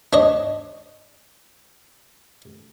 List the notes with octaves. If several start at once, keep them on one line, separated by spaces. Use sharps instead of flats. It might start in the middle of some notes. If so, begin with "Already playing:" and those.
D4 C#5 D#5